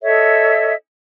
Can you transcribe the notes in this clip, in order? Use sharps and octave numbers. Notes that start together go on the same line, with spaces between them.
A4 C#5 D#5 E5